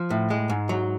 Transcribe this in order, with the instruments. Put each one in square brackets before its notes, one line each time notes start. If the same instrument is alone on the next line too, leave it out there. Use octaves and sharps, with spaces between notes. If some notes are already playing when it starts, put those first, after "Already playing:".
Already playing: [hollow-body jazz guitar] F3
A2
G#3
G#2
F#3